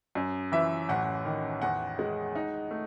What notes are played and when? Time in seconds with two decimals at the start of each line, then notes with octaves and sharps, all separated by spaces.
0.15 F#2
0.52 E3 E5
0.89 A1 F#5
1.25 D#3
1.62 E2 F#5
1.99 G#3
2.35 D#4
2.71 A3